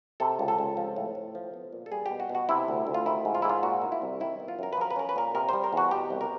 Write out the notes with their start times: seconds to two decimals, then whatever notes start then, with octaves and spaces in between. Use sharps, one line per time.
0.20 C3 A4
0.39 C#2
0.48 A4
0.58 C#2
0.77 F3
0.96 A2
1.15 A2
1.35 F3
1.54 B3
1.73 A#2
1.86 A4
1.92 G3 G#4
2.06 B2 G4
2.20 F#4
2.29 B2
2.35 F#4
2.49 C3 E4
2.68 D2
2.87 D2
2.94 F4
3.06 D#3 E4
3.25 G#2
3.35 F4
3.42 G#2 E4
3.49 F4
3.63 A#2 F#4
3.82 A#3
3.92 E4
4.02 C2
4.20 D#3 E4
4.40 B3
4.48 F4
4.59 F#2 A#4
4.73 B4
4.77 F3 A#4
4.91 B4
4.96 C#4 A#4
5.09 B4
5.16 A#2 A#4
5.35 C3 A#4
5.49 G3 C5
5.64 A#4
5.73 E2 F#4
5.91 B2 G4
6.10 C2
6.21 A#4